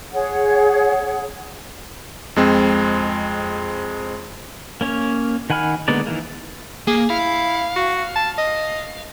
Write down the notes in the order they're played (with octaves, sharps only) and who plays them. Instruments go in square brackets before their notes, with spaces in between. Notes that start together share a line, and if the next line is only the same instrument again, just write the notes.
[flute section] G#4 C#5 F#5
[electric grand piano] F2 G#3 C4
[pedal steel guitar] A#3 C#4 C#5
D#3 F#5 G#5 B5 F6
D3 G#3 A#3 B3 D5
D#3 E3 A#3
[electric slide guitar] A#3 [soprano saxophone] G#4
[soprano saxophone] E4 [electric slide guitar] F5
[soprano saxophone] F#4
A5
D#5